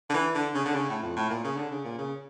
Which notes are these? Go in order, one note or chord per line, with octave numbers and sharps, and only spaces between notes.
D3
E3
D3
C#3
D3
C#3
A2
F2
A2
A#2
C#3
D3
C#3
A#2
C#3